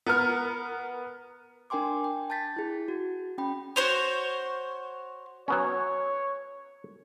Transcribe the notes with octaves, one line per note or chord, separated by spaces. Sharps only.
B3 A#4 F6
D4 A#4 G5 G#5 C6 D6
G5
A5 G6 A6 B6
E4 G#4
F#4
C#4 G5 B5
F#4 C5 C#5
F#3 B3 C#4 C#5